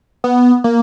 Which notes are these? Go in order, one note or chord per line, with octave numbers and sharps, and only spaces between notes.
B3
A#3